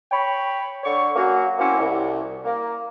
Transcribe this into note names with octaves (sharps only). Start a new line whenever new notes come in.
C#5 G5 B5
D3 C#5 C#6
F#3 A#3 C#4 F#4
F#3 A#3 C4 C#4 E4
C2
A#3